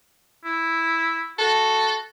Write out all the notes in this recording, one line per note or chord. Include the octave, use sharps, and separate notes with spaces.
E4
F#4 A4